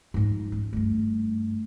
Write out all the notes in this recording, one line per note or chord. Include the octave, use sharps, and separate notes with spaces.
G#2 F3
C#4
G2 A3